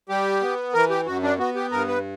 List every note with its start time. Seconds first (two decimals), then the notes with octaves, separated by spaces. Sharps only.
0.09 G3 G4
0.42 B3
0.74 E3 A#4
0.90 G4
1.06 F#2 F#4
1.23 D4
1.38 B3 F#4
1.55 G4
1.71 G2 A#4
1.88 B4